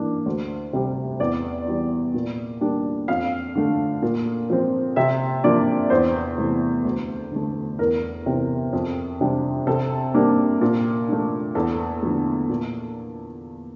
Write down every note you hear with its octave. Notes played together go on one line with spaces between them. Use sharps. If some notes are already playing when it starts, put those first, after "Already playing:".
Already playing: E3 A#3 D4
D2
C3 G3
E2 D5
E3 G3
A#2
G3 A#3 D4
F2 F5
D3 A3
A#2
F3 C4
C3 E5
F3 A#3 D4 D5
E2 C5
C3 E3 A3
D2
D3 A3
E2 A#4
C3 E3
F2
C3 G3 D4
C3 A4
G3 A#3 D4
A#2
A3 D4
E2 A4
D3 F3 A3
A#2